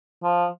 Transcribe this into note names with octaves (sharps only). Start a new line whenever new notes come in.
F3